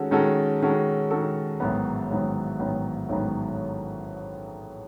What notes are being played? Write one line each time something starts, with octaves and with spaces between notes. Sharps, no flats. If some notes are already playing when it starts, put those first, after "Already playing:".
Already playing: D#3 G#3 C#4 F#4 A4
D#3 G#3 C#4 F#4 A4
D#3 G#3 C#4 F#4 A4
D#3 G#3 C#4 F#4 A4
A1 G#2 D#3 F#3 B3
A1 G#2 D#3 F#3 B3
A1 G#2 D#3 F#3 B3
A1 G#2 D#3 F#3 B3